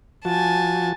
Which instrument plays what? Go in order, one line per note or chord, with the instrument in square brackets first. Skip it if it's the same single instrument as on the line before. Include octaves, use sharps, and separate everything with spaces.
[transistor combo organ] F3 F#4 [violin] G#5 A5